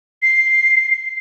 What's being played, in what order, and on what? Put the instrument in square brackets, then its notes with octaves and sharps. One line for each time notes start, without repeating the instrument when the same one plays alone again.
[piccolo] C7